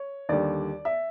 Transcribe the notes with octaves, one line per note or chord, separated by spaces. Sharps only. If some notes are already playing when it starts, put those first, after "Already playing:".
Already playing: C#5
D#2 D3 G3 D5
E5